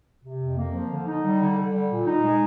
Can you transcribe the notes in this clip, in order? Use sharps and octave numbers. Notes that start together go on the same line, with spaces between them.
C3
F2
A#3
F3
D3
D#4
G3
D3
D3
G3
A#2
D#4
G#3